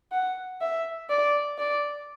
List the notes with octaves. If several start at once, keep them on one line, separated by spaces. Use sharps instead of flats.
F#5
E5
D5
D5